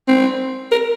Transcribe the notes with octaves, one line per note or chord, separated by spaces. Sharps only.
C4
A#4